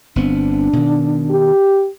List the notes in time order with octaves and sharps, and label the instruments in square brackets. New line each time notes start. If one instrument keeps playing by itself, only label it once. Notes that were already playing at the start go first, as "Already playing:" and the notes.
[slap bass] G1 B3 C4 [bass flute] D4
[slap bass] B2 D#3
[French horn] G4